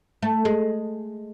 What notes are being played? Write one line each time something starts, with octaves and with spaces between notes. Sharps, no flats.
A3
G#3